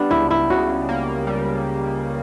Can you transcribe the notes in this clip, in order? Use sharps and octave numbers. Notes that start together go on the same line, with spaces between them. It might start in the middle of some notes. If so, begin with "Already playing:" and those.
Already playing: G3 B3 D4
C#2 E4
E4
C#3 F#4
A#3
G3